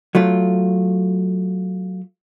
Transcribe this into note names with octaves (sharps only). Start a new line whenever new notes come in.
F#3 A3 F4